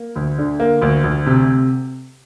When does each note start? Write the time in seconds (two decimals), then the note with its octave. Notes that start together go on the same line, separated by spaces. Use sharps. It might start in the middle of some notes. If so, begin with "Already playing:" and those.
Already playing: A#3
0.16 D2
0.39 D3
0.60 A#3
0.82 D2
1.04 D2
1.27 C3